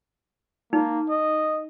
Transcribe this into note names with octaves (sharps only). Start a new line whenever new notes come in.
A#3 D#4
D#5